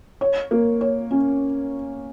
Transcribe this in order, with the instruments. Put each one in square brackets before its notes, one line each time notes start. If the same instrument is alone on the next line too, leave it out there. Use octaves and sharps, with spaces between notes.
[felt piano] C#5
A#3
C#5
C#4